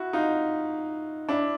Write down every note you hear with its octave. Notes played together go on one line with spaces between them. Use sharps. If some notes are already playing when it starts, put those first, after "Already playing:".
Already playing: E4 F#4
D#4 F4
D4 E4